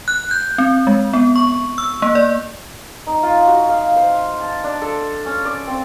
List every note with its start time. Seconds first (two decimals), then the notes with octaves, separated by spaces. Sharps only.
0.08 F#6
0.31 G6
0.58 C4
0.87 G#3
1.13 B3
1.36 C#6
1.78 E6
2.02 A#3
2.15 D5
3.07 D#4
3.23 F4
3.47 F#4
3.69 F5
3.96 C5
4.41 A5
4.64 D4
4.82 A4
5.26 C#4
5.45 D5
5.67 C4